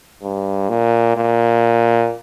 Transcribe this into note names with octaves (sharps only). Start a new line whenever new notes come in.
G2
A#2
A#2